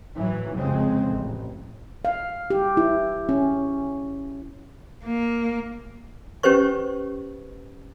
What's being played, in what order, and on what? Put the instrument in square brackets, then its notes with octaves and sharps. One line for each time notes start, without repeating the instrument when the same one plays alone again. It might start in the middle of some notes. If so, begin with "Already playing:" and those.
[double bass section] A2 E3 F#3
F1 F2 C#3 G#3 C4
A1
[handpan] F5
G4
E4
C#4
[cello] A#3
[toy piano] C#4 G4 B4 C5 C#6